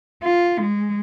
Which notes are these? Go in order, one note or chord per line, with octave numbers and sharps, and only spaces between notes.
F4
G#3